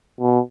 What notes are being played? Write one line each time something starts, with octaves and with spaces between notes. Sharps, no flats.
B2